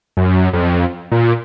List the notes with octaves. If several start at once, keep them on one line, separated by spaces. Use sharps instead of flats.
F#2
F2
A#2